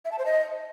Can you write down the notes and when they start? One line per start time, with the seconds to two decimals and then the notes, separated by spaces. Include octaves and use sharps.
0.05 E5
0.12 A5
0.19 C5
0.26 D#5